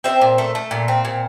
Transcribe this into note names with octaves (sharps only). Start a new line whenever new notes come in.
C4 C5 E5
A#2
A3
A3
A#2
C4
A#2